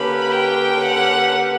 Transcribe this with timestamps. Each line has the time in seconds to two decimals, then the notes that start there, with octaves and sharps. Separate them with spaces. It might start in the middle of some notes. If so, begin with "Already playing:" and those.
Already playing: D3 A#3 C#4 G4 B4 B5
0.32 G5
0.82 F#5